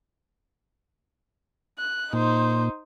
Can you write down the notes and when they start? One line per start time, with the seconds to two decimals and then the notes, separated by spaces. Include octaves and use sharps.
1.79 F#6
2.13 A#2 D#4 C5